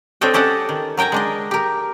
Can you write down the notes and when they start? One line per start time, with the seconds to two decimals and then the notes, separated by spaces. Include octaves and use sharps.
0.21 C4 D4 A4 C#5 D#5 G5
0.34 C#4 G4 A4 D#5 F#5 A5
0.69 D#3
0.97 F#3 A#4 G5 G#5 A#5
1.12 G#3 D4 D#5
1.51 G4 A#4